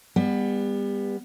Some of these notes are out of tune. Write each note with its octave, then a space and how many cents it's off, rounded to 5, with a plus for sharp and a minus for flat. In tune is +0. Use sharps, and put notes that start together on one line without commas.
G3 +35 B3 +0